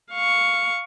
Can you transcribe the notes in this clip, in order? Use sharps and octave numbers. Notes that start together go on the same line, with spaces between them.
F5 C#6